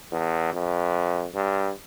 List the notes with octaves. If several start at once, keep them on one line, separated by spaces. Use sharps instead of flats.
E2
F2
G2